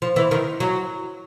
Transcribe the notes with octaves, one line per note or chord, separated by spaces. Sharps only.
F3
E3
D#3
F#3